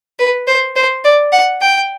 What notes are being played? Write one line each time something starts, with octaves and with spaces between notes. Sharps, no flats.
B4
C5
C5
D5
F#5
G5